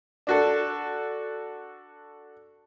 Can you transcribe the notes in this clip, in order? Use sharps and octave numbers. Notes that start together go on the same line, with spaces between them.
D4 F#4 A4